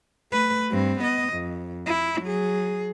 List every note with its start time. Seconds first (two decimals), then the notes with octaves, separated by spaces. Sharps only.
0.32 A3 B4
0.71 G2 C4
1.00 B3 D#5
1.34 F2
1.87 E4
2.22 F#3 G#4